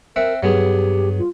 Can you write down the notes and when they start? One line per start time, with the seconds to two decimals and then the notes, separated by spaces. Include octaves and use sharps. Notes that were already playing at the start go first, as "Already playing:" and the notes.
0.16 C4 A#4 E5 F#5
0.43 G2 F#3 B3 G4 G#4
1.19 F4